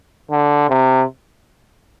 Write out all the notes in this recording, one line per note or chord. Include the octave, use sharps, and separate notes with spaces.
D3
C3